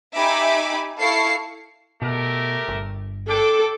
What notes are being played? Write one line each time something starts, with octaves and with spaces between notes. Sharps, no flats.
D#4 G4 E5 G#5 B5 D6
E4 A4 F5 C#6 C7
B2 A3 G4 A#4
G1
D4 A4 G5 D6